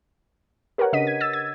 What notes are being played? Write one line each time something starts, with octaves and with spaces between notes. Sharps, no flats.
G4 A#4 B4 C#5 F#5
C#3 D4 D#5 B6 D#7
G#6
E6 A6
G#6